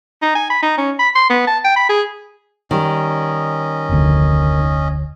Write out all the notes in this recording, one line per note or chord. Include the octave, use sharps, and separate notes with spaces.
D#4
G#5
B5
D#4
C#4
B5
C6
B3
A5
G5
B5
G#4
D#3 G3 C#4 D#5
F1 D2